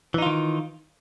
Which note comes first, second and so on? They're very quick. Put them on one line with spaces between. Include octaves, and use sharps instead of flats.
E3 D#4 F4 D#3